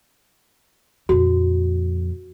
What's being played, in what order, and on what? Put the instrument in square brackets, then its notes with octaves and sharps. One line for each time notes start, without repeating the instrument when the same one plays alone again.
[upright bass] F2 A#2 [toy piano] F#4